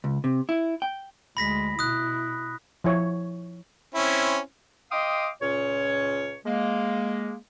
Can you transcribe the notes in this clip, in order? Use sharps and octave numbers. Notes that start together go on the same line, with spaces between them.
C#2
C3
E4
G5
D2 G#3 B5 A#6 B6
B2 E4 D#6 F#6
F3 E4 C#5
C4 C#4 E4
D#5 F5 G5 C6 D6 D#6
C#2 A#2 C#4 C#5
G#3 A#3